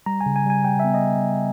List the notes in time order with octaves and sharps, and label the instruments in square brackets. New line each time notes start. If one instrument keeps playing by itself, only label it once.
[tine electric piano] G3 A#5
G#5
C#3
G#5
G3 G#5
G3 G5
B3 E5
D#5